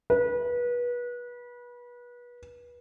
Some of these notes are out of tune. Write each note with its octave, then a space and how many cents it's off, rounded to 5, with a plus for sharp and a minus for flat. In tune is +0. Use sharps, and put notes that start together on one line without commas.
B4 -30